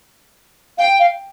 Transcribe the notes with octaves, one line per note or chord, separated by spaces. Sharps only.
F5 G5
F5